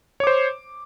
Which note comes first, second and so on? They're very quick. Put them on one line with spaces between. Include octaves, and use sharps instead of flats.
C#5 D6 C5